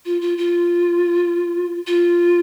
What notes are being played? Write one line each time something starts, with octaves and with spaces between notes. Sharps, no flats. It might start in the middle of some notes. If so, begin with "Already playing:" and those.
F4
F4
F4
F4